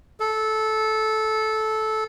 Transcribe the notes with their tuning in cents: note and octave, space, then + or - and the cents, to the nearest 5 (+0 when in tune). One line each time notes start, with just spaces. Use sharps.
A4 -15